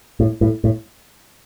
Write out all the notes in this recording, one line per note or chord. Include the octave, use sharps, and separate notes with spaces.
A2
A2
A2